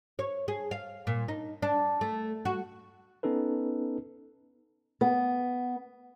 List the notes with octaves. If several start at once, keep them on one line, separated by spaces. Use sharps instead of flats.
C#5
G#4
F5
A#2
D#4
D4
A3
F#4
B3 C#4 D#4 A4 B4
B3